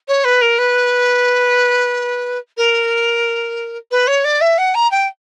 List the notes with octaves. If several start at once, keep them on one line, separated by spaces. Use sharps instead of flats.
C#5
B4
A#4
B4
A#4
B4
C#5
D5
E5
F#5
A#5
G5